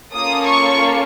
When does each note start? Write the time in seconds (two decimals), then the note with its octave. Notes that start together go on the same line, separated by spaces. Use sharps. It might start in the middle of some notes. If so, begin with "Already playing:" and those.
0.14 A#3 C#4 F4 A4 D#6
0.46 C#6